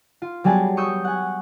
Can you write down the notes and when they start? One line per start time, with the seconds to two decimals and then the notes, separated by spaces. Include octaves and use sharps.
0.22 F4
0.44 F#3 G3 B3 G#4 G#5 A5
0.77 C#6 D#6 E6 G6 C#7
1.04 F#5 G#5